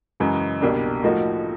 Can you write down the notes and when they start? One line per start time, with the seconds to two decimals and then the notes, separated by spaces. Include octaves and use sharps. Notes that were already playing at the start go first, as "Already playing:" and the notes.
0.20 F#2 C#3 E3 G#3
0.61 C2 B2 G3 A#3 D4
1.03 A2 F3 A#3 D#4 F#4